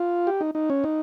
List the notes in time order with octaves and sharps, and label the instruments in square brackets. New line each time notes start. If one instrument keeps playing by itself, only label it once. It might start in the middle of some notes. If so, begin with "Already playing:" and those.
Already playing: [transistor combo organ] F4
G4
D#4
D#4
C#4
D#4